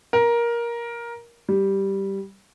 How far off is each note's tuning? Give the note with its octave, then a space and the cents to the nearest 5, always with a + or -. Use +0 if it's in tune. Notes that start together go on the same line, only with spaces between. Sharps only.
A#4 +15
G3 -5